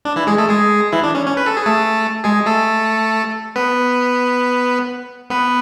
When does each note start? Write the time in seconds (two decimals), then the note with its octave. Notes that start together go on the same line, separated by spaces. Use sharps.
0.05 D4
0.16 E3 E4
0.27 G#3 G#4
0.38 A3 A4
0.49 G#3 G#4
0.93 E3 E4
1.03 D4
1.15 C#4
1.26 C#4
1.37 B4
1.46 A4
1.57 G#4
1.66 A3 A4
2.24 G#3 G#4
2.46 A3 A4
3.56 B3 B4
5.30 B3 B4